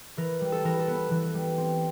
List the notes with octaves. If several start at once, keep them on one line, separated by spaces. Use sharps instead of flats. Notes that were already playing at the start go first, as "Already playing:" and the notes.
E3 A#4
G3
A4
E3 A#4
A4
B3
E3
G3
C4